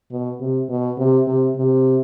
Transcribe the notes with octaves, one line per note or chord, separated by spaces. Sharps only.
B2
C3
B2
C3
C3
C3